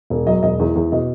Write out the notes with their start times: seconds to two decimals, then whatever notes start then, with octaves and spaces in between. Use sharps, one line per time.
0.10 E1
0.26 F#3 D#5
0.43 E1 D#5
0.59 E2
0.75 E2
0.92 B2 D#5